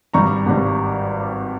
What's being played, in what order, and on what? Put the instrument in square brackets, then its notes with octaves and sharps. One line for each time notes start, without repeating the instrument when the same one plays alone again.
[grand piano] G#1 G2 G3 A#5 C#6
G#1 G2 G3